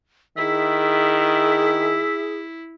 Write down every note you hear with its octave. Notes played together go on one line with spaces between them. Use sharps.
D#3 E4 G#4 E5